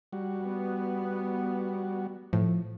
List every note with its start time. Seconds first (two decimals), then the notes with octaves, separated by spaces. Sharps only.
0.13 G3 F#4
0.44 B3
2.33 A2 F3